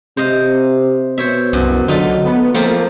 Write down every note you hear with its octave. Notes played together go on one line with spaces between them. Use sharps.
C3 C5 D#5 F5
B2 C5 C#5 E5
C2 F#2
D3 F#3 A3 D#4 F4
B3
F2 F3 A3 A#3 C4